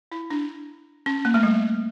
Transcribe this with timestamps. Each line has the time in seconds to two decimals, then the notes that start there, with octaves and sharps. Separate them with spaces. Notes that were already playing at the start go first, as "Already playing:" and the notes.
0.12 E4
0.30 D4
1.06 C#4
1.25 A#3
1.34 A3
1.43 G3